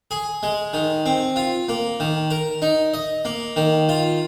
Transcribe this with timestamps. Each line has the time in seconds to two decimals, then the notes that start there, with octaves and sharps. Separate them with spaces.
0.11 G#4
0.43 G#3
0.73 D#3
1.06 C4
1.36 F4
1.69 A#3
2.00 D#3
2.30 A#4
2.62 D#4
2.94 D#5
3.25 A#3
3.56 D#3
3.89 F4